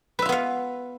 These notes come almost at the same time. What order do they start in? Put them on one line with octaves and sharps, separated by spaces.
B4 E5 F4 B3 F5